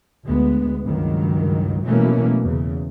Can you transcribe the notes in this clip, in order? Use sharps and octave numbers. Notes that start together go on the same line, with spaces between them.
D2 G#3 B3
C#2 G2 D#3 F#3
B2 E3 F#3 A3 A#3 C#4
E2 C#3